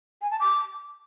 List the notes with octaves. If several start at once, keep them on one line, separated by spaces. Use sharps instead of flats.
G#5
A5
D6